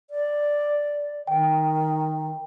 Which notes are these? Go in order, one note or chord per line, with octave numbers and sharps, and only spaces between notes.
D5
D#3 G5